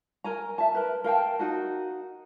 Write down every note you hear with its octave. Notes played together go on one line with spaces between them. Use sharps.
A#4 G#5 A#5
E5 A5
A#4 B4
A#4 F5 G5 A5
D#4 F#4 A#4